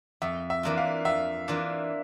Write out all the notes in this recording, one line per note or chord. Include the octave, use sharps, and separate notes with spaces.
F2 E5
E5
E3 A#3 D4 F4
F5
F2 E5
E3 A#3 D4 F4